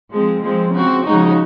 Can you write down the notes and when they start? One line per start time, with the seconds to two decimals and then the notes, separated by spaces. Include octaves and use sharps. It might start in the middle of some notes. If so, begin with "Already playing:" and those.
0.11 F3 G#3 C4
0.43 F3 G#3 C4
0.73 C#3 F3 C4 F#4
1.05 C#3 F3 G#3 D#4 F#4